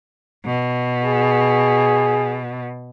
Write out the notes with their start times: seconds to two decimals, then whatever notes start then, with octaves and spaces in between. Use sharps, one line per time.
0.46 B2
1.05 G#4